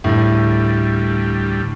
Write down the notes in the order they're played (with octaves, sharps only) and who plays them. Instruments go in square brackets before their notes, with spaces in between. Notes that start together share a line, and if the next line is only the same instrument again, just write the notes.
[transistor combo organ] D2 G3 [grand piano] A2